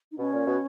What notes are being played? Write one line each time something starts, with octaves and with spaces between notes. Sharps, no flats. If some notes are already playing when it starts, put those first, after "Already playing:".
D#4
B2 C#4
A#2
B2